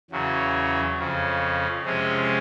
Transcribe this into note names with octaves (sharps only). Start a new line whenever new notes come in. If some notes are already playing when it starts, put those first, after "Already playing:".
E2 C#3 F#3
F2 C#3 F3
C3 F3 G#3 C#4